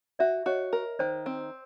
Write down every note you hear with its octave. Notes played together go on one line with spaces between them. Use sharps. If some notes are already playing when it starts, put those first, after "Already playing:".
F#4 D5 E5
F#4 C#5 D#5
A#4
D#3 C5 D5
C4